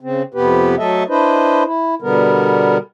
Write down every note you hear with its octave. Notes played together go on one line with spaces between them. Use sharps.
C#3 C4
F2 C3 B3 G4 B4
F#3 A3 A4 D#5 E5
D4 E4 B4 C5 D#5
E4
B2 D3 G3 B3 A#4